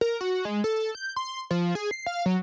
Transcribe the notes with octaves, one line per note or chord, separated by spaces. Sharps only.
A#4
F#4
G#3
A4
G6
C6
F3
G#4
C7
F5
F#3